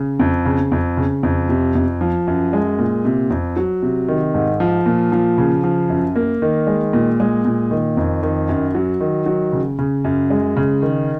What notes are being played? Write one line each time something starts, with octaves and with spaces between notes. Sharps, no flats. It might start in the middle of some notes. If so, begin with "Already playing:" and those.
Already playing: C#3
F2
C#3
F2
C#3
F2
C3
F2
F3
F#2
G#3
A#2
C3
F2
F#3
C3
D#3
G#2
F3
A#2
F3
C#3
F3
F#2
A#3
D#3
G#3
A#2
G#3
A#2
D#3
F2
D#3
F#2
F#3
D#3
F#3
C#3
C#3
F#2
G#3
C#3
D#3